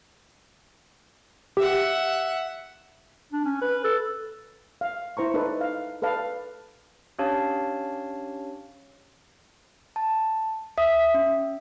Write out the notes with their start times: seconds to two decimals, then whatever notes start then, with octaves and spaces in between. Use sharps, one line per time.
1.57 G4 E5 F#5
3.33 D4
3.45 C#4
3.62 B4
3.84 A4
4.81 F5
5.17 E4 C5 A#5 C#6
5.34 D#4 A4 B4 D5
5.61 F5
6.02 A4 B4 D5 F5 A5
7.19 C#4 D4 G4 C#5 F5 A5
9.96 A5
10.78 E5 D#6
11.14 C#4